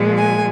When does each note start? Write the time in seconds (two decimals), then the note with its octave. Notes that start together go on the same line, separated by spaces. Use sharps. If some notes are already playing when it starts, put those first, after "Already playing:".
Already playing: A#2 F3 G#3
0.18 G#5